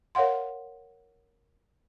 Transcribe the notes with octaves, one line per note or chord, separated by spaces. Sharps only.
A#4 C#5 F5 F#5 C6